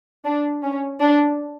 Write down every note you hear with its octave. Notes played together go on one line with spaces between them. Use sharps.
D4
C#4
D4